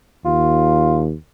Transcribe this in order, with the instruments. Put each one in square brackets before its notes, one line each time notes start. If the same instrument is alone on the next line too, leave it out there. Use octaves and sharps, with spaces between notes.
[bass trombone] D#2 [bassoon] F4